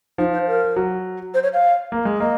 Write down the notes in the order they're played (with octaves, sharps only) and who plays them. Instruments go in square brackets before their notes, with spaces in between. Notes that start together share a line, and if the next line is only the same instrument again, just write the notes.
[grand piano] F3 [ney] D#4
[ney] C5
A#4
[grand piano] F#3
[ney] C5
C#5
F5
[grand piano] A#3
G#3
[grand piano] A#3 [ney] D#5